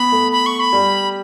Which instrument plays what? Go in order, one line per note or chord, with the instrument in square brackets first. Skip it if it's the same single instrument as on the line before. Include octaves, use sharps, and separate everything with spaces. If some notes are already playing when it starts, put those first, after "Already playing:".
Already playing: [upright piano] B3 [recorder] B5
[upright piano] A3
[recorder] B5
C#6
B5
[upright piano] G3